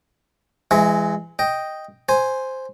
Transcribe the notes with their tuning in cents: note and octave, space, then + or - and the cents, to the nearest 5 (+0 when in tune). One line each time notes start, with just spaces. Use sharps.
E3 +30 G#3 -10 E5 -40
D#5 +0 G5 +0
C5 +0 G#5 +0